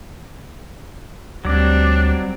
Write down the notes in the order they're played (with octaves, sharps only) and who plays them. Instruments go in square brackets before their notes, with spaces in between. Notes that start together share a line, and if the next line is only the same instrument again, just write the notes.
[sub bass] D2 [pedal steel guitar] F#3 D5 [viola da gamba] G3 C4 [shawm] D4